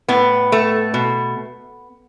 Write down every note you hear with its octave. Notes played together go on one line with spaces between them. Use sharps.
A2 B3
A3
B2